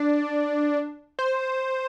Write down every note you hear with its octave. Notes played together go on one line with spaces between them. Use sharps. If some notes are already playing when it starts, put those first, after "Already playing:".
Already playing: D4
C5